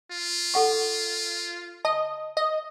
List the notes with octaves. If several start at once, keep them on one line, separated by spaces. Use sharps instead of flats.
F4
A4 F#5 C#6
D#5 A5
D#5